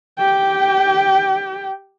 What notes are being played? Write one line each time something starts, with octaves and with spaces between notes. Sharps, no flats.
G4 G5